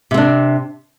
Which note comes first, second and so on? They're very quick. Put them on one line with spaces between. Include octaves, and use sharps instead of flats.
C3 C4 D4